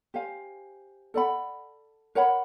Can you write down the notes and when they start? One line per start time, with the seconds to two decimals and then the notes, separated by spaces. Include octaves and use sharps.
0.14 G4 C5 F5 G#5
1.14 A4 D5 F#5 B5
2.15 A#4 C#5 F#5 B5